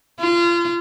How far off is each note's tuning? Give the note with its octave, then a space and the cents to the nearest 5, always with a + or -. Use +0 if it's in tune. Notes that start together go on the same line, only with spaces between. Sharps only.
F4 -30